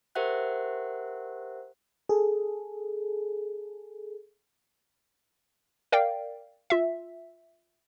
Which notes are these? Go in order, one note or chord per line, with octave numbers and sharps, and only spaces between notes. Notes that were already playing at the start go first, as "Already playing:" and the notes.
G4 A#4 C5 E5 F#5 F#6
G#4 A4
A#4 D5 F5 G5
F4 E5